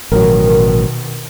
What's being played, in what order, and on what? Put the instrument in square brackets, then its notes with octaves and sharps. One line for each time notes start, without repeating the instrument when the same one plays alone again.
[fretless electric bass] A1 F#3 [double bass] B2 D#3 [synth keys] A#4